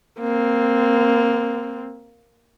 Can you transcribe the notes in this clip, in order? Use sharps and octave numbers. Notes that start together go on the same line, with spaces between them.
A#3 C4